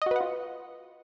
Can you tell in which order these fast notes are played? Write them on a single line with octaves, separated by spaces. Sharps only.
D#5 F#4 B4 F#5 F4